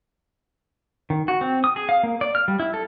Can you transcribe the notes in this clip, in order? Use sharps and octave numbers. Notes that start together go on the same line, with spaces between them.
D#3
F#4
C4
D#6
G#4
F5
A#3
D5
F6
G3
E4
A4